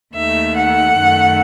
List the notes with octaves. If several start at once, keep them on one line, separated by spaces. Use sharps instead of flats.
D#2 D#3 A3 E5
F#5
F#2 D#3 A3